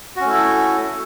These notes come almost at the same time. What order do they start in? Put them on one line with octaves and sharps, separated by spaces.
F#4 C#4 A3 E4 A4